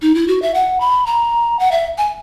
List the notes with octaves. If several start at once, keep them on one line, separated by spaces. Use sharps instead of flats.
D#4
E4
F#4
E5
F#5
B5
A#5
F#5
E5
G#5